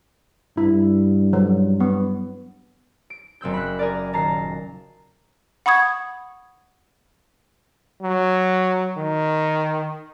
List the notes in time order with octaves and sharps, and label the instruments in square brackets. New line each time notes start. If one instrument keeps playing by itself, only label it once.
[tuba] G2 [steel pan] E4
[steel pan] F#3
B3
[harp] D7
F#1 C4 E6 G6
B5 F#6
G#4 A#4 D5
D#1 A5 A#5 A#6 C7
[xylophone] F#5 B5 C#6 D#6 G#6
[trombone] F#3
D#3